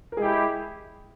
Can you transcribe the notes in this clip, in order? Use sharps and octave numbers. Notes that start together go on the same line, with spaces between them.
A#4
G#3 E4 G4 G#4